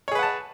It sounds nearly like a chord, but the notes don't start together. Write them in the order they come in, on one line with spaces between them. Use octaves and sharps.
C#5 G#4 B4 F#5 A5